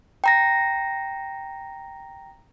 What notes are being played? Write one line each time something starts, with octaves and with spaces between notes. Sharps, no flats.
G5 A#5 A#6